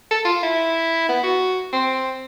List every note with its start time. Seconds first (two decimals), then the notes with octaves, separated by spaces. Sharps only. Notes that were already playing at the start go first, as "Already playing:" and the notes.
0.11 A4
0.25 F4
0.43 E4
1.09 B3
1.23 F#4
1.73 C4